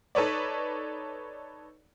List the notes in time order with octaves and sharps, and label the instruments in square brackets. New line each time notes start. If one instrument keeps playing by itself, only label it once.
[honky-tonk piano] D#4 A4 B4 C#5 D5